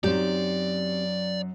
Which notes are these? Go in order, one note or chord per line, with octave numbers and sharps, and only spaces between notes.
F#2 F#3 C4 D#4 G4 D5